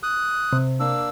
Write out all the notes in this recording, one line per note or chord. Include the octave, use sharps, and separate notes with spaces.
D#6 F#6
C3
A#3 D4 E6